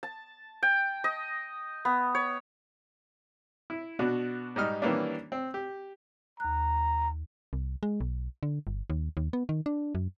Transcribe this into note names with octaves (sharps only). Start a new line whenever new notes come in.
A5
G5
D#5
B3
C#5
E4
B2 D4 F#4
G#2 G3 D#4 F6
D#3 E3 G3 A#3 C#4 D4
C4
G4
D#2 A#5 F#6
C2
G#3
B1
D3
G1
D#2
D#2
B3
D#3
D4
F#2